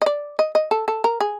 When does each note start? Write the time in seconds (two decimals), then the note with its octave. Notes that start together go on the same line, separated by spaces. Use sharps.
0.02 D#5
0.06 D5
0.39 D#5
0.55 D#5
0.71 A4
0.88 A4
1.04 A#4
1.21 G#4